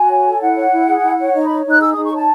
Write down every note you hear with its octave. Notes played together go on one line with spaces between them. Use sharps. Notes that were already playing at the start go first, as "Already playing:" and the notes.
Already playing: F#4 G#5
C#5
A4
E4 F#5
C#5
E4
G#4
E4
C#5
D#4 D#5
C#5 B5
D#4 F#6
G#4 E6
D#6
D#4
C#6
C#5 A5